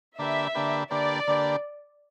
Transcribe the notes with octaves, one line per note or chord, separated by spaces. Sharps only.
D3 A#3 D4 G4 B4 E5
D3 A#3 D4 G4 B4
D3 A#3 D4 G4 B4 D5
D3 A#3 D4 G4 B4